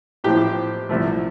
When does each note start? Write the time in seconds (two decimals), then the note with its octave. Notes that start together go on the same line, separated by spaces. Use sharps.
0.24 A1 A2 F3 C4 G4
0.89 C2 C3 F3 A3